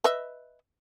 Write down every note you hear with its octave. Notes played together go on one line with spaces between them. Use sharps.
B4 D#5 E5